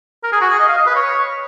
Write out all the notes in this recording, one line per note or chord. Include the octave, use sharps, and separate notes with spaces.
A#4
G#4
F#4
G#4
D#5
F5
D#5
B4
C#5